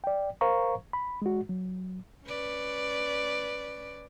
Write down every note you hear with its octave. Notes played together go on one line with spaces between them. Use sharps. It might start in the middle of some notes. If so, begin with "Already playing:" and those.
D5 G5
A#4 C5 F5 A#5 C#6
B5
G#3 F#4
F#3
C#4 B4 D5